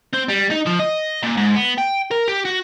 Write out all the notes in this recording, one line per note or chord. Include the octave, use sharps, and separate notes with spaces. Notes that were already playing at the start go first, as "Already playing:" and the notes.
C4
G3
D#4
F3
D#5
A#2
G#2
B3
G5
A#4
G4
F#4